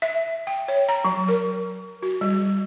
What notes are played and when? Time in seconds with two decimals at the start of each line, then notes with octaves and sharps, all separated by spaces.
0.02 E5
0.47 G5
0.68 C#5
0.89 A#5
1.05 F#3
1.29 A#4
2.02 F#4
2.21 G3